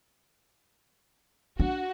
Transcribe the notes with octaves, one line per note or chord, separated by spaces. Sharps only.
D4 F#4